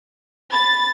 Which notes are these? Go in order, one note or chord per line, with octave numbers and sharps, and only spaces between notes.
B5 A6